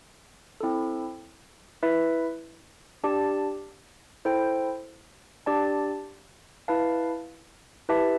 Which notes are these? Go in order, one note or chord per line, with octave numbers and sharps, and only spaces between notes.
C4 E4 A4
E4 B4 E5
D4 G4 D5 A5
E4 A4 C5 G5
D4 G4 D5 A5
E4 B4 F5 A5
E4 G4 B4 E5 A5